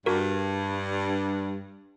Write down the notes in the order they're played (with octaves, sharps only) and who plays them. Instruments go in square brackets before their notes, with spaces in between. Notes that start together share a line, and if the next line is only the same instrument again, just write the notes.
[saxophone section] G2 [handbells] F#4 A#4